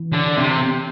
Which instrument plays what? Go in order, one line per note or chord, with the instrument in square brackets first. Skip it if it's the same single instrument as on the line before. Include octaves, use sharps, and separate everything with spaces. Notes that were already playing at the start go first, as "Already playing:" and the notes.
Already playing: [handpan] E3
[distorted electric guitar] D3
C3